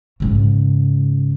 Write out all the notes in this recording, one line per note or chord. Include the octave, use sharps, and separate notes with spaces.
G#2 C#3